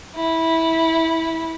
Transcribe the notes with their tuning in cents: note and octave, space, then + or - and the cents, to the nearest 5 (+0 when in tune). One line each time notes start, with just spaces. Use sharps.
E4 -15